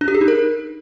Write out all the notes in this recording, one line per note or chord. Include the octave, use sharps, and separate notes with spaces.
D4
G4
G#4
D#4
A#4